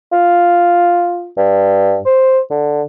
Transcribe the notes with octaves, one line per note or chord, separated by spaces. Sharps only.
F4
G2
C5
D3